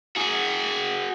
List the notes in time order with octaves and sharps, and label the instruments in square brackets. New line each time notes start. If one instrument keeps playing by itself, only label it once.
[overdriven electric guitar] F#4 G#4